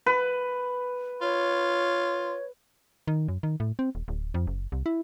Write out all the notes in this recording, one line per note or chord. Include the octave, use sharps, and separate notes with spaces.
B4
F4 C#5
D#3
F#2
D#3
A2
C4
D#1
D1
F2
F#1
C2
E4